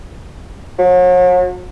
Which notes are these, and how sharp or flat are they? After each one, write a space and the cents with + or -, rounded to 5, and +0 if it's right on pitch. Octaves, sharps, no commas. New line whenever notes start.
F#3 -40